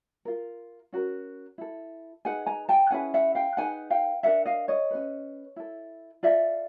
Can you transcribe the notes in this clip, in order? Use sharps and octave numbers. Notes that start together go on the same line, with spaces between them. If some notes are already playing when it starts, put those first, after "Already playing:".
F4 A#4
C#4 F#4 A#4
E4 A4
D#4 G#4 B4 F#5 G#5
G#5 A#5
G5 A5
C#4 E4 G#4 B4 F#5 G#5
E5 F#5
F5 G5
D#4 G#4 B4 F#5 G#5
F5 G5
D4 G4 A#4 E5 F#5
D#5 F5
C#5 D#5
C#4 F#4 B4
E4 A4
F4 A4 D5 E5